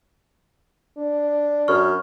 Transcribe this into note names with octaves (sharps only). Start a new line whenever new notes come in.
D4
F#2 C#6 F6